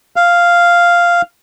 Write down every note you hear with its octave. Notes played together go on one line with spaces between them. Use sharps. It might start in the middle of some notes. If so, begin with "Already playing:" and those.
F5